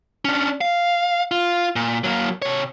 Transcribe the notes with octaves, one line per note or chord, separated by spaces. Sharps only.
C#4 D4
F5
F4
A#2
F#3 A#3
C3 C#5